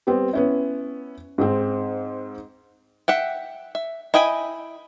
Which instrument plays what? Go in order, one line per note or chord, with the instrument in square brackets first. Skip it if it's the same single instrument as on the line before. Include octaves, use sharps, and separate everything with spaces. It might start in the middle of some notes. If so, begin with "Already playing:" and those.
[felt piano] G3 B3 C4
B3 C#4 E4
G#2 G#3 C4
[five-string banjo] E5 F#5 G5
E5
E4 D#5 G5 G#5 B5